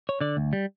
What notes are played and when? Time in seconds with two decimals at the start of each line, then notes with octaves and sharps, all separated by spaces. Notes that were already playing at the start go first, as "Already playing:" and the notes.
0.09 C#5
0.21 D3 D5
0.37 D2
0.53 G3